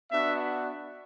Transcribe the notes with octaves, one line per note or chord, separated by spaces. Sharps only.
B3 D4 F#4 E5